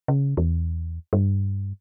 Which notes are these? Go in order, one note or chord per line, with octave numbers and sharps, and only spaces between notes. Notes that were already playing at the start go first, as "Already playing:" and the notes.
C#3
E2
G2